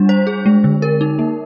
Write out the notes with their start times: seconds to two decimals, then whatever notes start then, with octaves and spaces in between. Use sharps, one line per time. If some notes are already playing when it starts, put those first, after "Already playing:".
Already playing: G3 D4
0.09 C5
0.27 G#4
0.46 G#3
0.64 D3
0.82 A#4
1.01 D#4
1.19 A#3